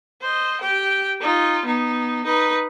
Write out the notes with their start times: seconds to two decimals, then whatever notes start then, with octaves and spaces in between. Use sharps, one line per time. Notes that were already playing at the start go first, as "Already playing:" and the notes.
0.22 C5 D#5
0.61 G4 G5
1.21 D#4 F4
1.65 B3 D#4
2.25 D#4 B4